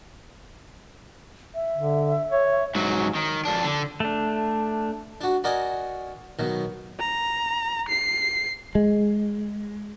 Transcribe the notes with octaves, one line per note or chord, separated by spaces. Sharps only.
E5
D3
C#5
G#2 F#3
D#3
F2 D4
D3
A3 D4
D4 F#4
F#4 A#4 D5 D#5 G#5
B2 D#3 F#3
A#5
C7
G#3